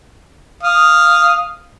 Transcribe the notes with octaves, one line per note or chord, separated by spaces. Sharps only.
F5 D#6